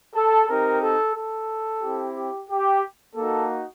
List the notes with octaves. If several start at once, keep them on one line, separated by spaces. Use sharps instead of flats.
A4
C4 D#4 G4 A#4
A4
A4
C4 E4 G4
G4
G4
A#3 D#4 F#4 A4